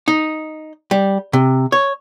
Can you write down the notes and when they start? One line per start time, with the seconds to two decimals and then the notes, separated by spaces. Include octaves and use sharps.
0.08 D#4
0.91 G3
1.33 C3
1.72 C#5